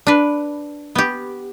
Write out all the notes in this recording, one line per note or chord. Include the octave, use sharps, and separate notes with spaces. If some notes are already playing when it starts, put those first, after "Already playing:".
D4 B4
B3 G4